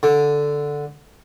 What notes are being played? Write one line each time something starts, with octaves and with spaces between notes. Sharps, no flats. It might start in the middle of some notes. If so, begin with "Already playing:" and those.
D3